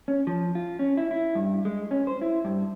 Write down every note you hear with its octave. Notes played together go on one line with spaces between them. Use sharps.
C#4
F3
F4
C#4
E4
E4
G2
G#3
C#4
C5
E4
G2